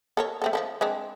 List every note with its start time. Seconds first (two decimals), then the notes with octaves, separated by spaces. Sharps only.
0.17 A4 A#4 C#5
0.42 A3 C4 A4
0.53 F3 E4 A4
0.81 G#3 C4 D4